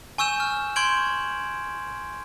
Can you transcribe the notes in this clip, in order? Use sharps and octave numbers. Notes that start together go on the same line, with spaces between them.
G#5 C#6 E6 G6 E7
F6
C6 C#6 G6 G#6 D7 F#7